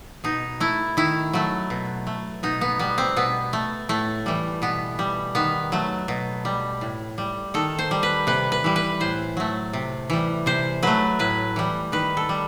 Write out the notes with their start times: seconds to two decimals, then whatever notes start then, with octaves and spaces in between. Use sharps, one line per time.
0.24 B2 D#4
0.60 A3 E4
0.97 D#3 E4
1.33 F#3 A3
1.70 B2
2.07 A3
2.43 B2 D#4
2.61 B3
2.79 G3 B3
2.98 C4
3.16 B2 B3
3.53 A3
3.89 A2 A3
4.26 E3 G3
4.62 B2 B3
4.99 G3
5.35 D#3 B3
5.72 F#3 A3
6.08 B2
6.45 G3
6.81 A2
7.18 G3
7.54 D#3 A4
7.79 C5
7.91 G3
8.03 B4
8.27 C3 B4
8.52 B4
8.64 E3 G3
8.76 B4
9.00 A2 C5
9.37 F#3 A3
9.73 C3
10.10 E3 G3
10.46 C3 C5
10.83 F#3 A3 B4
11.19 A2 B4
11.56 E3 G3
11.92 D#3 B4
12.17 A4
12.29 G3